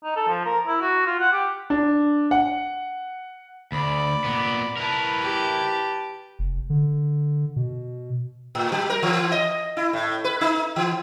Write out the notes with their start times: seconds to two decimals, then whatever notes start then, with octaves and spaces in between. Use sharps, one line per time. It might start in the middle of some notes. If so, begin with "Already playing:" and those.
0.04 D#4
0.16 A4
0.29 F3
0.46 A#4
0.67 E4
0.81 F#4
1.06 F4
1.19 F#5
1.32 G4
1.70 D4
2.31 F#5
3.72 D2 D5 B5
4.24 A#2 B3
4.77 E4 A#4 B4 A5
5.21 G4
6.39 F1
6.70 D3
7.56 B2
8.55 A2
8.72 F#3
8.90 A#4
9.02 E3
9.32 D#5
9.77 E4
9.93 A2
10.24 B4
10.41 D#4
10.76 E3